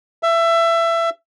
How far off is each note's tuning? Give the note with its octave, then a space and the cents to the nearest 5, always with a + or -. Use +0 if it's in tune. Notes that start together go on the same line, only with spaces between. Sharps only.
E5 +20